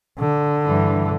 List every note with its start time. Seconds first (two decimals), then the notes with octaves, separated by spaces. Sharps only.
0.19 D3
0.66 G2 E3